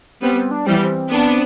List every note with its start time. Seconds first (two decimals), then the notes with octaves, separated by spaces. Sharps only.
0.21 G3 B3 C4
0.37 C4
0.51 D4
0.66 E3 G3 C4
0.76 B3
0.84 C4
1.10 B3 D4